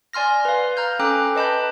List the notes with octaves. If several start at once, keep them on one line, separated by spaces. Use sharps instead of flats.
D5 G#5 C6 F6 A#6
B4 F5
A#5 F6 G6
C#4 A4 G5 A#5 D6 F#6
B4 D#5 A5 B5 G6